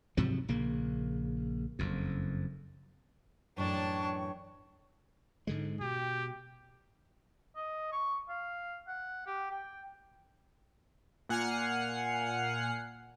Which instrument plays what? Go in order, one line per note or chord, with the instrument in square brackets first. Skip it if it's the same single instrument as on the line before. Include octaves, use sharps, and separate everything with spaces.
[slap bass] G#2 C3 F3 F#3
A#1 C#3 A#3
F#1 F2
[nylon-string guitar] F#2 A2 E3 [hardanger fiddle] D4 A5 [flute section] C#5 G5 C#6
[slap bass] G#2 D3 G#3
[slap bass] B2 [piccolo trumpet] G4
[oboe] D#5
C#6
F5
F#5
G4
G5
[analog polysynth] A#2 F#5 G#5 F6 C7 C#7